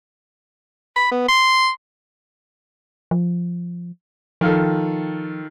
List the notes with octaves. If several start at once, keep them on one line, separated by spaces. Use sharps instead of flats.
B5
B3
C6
F3
D#3 F3 F4 A4